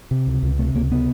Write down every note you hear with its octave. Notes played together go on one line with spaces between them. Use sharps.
C3
C#2
C#2
C3 A3
C#2 A#3
C3 B3